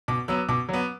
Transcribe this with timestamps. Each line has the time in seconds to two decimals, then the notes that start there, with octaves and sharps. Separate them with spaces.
0.08 B2 D6
0.28 F#3 B3 E6
0.49 B2 D6
0.69 F#3 B3